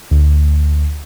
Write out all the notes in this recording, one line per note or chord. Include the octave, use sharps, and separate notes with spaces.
D2